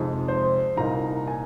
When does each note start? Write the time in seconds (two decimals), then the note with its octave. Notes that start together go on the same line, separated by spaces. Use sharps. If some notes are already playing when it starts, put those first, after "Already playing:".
Already playing: F2 C3 F3 G#3 D#4
0.28 C5
0.77 C2 A#2 A#3 D#4 A#5
1.28 G#5